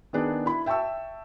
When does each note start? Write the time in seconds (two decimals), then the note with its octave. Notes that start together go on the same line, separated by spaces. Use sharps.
0.13 D#3 B3 D4 G#4 D5
0.46 E4 B5
0.66 E5 G5 A5 C#6 E6